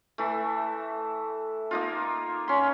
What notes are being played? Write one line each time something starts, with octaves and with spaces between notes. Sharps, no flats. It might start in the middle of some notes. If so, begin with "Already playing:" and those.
E3 A3
A#3 D#4 F4
C#4 C6